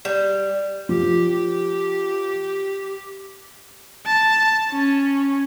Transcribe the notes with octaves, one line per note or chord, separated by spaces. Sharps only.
G3
F3 G4
A5
C#4